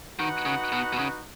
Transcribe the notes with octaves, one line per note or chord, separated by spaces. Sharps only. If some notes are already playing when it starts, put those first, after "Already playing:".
D#3 D#4 F#4 B4 F#5
C#3
B2
B2
C#3